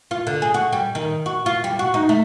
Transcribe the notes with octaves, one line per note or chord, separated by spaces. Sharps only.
F4
D3
G#4
F#4
G3
D#3
F#4
F4
G3
F#4
D#4
A3